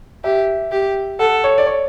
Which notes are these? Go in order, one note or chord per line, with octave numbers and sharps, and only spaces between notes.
G4 E5
G4
A4 F#5
C#5
D5
C#5